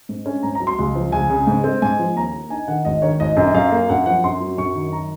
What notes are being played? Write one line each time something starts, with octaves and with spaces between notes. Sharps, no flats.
G#2
C#4
G#2 A#5
A#5
F#3
C6
C#2
F3
C#2 G#5
C#3
G#2
C4
G#2 G#5
F3
D#2 A#5
A#3
D#4 G#5
D#3 F#5
G#1 D#5
D#3 C#5
G#1 D#5
F#2
F#2 F5
A#3
F#2 F#5
F3 F#5
F#2 C6
F#3
F#2 C#6
D#3
A#5